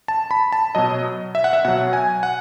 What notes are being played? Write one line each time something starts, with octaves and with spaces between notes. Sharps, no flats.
A5
B5
A5
B2 F#3 D#5
E5
F#5
E5
B2 F#3 F#5
G#5
F#5